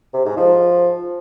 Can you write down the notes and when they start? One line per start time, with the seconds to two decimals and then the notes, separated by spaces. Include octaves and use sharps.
0.14 C3
0.25 G#2
0.37 F3